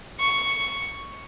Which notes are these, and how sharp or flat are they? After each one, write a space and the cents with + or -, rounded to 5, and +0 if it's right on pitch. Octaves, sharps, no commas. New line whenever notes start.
C#6 +5